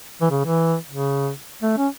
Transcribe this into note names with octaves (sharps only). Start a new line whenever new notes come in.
E3
C#3
E3
C#3
A3
C#4